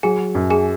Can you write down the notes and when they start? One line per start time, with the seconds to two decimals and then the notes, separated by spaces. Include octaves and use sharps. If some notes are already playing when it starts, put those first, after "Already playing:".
0.03 F#3 G#4 G#5
0.35 F#2
0.50 G#4 G#5